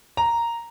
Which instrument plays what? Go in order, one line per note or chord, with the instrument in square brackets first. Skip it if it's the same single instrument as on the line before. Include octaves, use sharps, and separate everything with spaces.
[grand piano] A#5